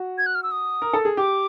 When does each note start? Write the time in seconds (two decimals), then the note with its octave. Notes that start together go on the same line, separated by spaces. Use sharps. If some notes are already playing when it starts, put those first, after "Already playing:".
Already playing: F#4
0.18 G#6
0.26 F#6
0.35 F6
0.43 E6
0.51 D#6
0.82 A#4
0.93 A4
1.05 G#4
1.17 G4 D6